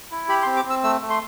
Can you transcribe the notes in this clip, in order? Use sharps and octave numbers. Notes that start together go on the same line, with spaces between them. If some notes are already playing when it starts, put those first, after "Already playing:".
E4
G4 B5
C6
C4
D6
C4
E6
A3 E6
A3
C6